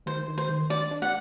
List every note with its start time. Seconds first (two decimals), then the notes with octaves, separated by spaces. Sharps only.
0.06 D#3 C5
0.28 D#3
0.38 C5
0.49 D#3
0.70 D4 D5
0.91 D4
1.02 F#5